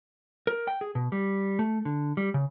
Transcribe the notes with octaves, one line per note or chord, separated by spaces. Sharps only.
A#4
G5
G#4
B2
G3
A3
D3
G3
C#3